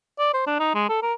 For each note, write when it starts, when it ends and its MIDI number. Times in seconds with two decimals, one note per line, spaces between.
0.19 0.33 74
0.34 0.44 72
0.47 0.56 62
0.59 0.72 63
0.75 0.85 56
0.89 0.98 69
1.02 1.13 70